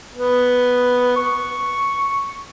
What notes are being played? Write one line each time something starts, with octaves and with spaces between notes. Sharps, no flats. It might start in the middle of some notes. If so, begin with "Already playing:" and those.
B3
C#6